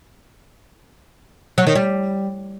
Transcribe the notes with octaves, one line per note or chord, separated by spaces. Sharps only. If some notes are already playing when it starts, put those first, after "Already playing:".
F#3
D#3
G3